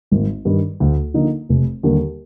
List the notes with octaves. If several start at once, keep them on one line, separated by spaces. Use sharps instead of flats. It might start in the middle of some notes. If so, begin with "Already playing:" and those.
G#1
G2 D#3
D2
D3 F3 A#3 D#4
F1
D#2 D3 G3